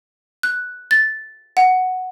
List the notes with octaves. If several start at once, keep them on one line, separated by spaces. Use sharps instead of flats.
F#6
A6
F#5